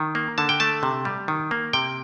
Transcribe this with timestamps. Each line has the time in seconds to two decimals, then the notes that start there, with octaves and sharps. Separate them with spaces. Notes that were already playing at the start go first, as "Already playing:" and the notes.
Already playing: D#3
0.15 A#3
0.38 D3 A5
0.49 G5
0.60 A3 A5
0.83 C3
1.05 G3
1.28 D#3
1.51 A#3
1.73 C3 G5